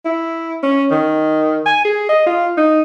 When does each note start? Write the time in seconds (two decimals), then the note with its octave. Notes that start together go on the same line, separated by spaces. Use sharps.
0.05 E4
0.63 C#4
0.91 D#3
1.66 G#5
1.85 G#4
2.09 D#5
2.26 F4
2.57 D#4